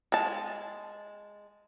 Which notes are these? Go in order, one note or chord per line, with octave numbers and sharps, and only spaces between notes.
G#3 A5